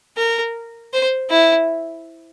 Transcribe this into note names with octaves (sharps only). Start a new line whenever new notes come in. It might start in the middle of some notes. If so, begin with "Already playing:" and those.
A#4
C5
E4